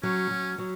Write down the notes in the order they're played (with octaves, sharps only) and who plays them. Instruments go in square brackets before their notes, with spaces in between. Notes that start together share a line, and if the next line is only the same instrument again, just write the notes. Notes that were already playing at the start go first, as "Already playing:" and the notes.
[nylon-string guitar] F#3 [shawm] C#4
[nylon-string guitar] F#3
F#3